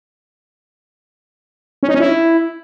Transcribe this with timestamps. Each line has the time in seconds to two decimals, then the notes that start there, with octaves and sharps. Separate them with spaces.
1.83 C#4
1.89 D#4
1.94 C#4
2.00 E4